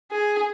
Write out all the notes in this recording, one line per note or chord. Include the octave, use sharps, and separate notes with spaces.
G#4